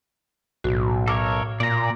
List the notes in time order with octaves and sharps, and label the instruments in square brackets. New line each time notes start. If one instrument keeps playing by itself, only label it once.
[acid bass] B1 [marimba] A2 F#4
[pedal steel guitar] A4 A#4 C#5 [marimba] D6
[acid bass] A#2 [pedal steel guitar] D5 A#5